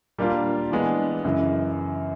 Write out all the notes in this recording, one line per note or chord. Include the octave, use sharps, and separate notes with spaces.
A#2 G3 A#3 D4 F4
E3 G#3 B3 D4
F#2 C#3 E3